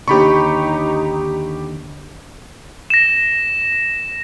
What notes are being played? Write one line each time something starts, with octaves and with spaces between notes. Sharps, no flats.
D#2 D3 D#4 G4 B5 C#6
A#6 E7